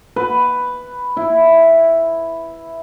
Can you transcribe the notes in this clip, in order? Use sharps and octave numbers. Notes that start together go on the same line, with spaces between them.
B4
E4